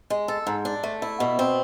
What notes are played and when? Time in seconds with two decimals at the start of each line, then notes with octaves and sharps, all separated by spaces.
0.10 G#3
0.28 A4
0.47 G#2
0.65 D4
0.83 A3
1.02 E4
1.20 B2
1.39 C4